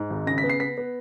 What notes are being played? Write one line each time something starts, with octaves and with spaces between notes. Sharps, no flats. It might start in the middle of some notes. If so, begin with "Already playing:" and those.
Already playing: G#2
G#1
C#3 A#6
B6
B3
C7
B3 B6
B3